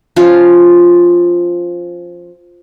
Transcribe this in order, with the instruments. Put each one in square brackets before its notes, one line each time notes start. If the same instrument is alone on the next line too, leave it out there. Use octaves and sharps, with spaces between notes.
[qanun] F3 C#4 F4